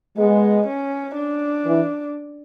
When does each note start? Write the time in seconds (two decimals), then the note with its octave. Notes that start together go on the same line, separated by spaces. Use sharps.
0.18 G#3 B3
0.67 C#4
1.16 D4
1.66 E3